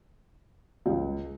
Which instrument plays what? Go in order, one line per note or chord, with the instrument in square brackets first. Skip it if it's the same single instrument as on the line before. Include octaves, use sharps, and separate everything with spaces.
[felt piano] C#2